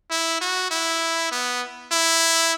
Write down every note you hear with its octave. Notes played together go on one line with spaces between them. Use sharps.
E4
F#4
E4
B3
E4